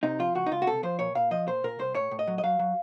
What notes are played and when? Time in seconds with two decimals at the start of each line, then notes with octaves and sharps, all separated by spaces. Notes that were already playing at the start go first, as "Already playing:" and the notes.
0.03 C3 D#4
0.19 F3 F4
0.35 C#2 F#4
0.46 D#4
0.52 C#2 F4
0.62 F#4
0.67 C3 A4
0.83 F3 C5
0.99 A#2 C#5
1.15 A#2 F5
1.31 F3 D#5
1.47 A#2 C5
1.64 A#2 A#4
1.79 C2 C5
1.95 A2 C#5
2.11 A2
2.19 D#5
2.27 F#3
2.38 D#5
2.43 F#3 F5
2.59 F#3